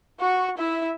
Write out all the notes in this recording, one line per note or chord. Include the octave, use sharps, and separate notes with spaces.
F#4 C#6
E4 E5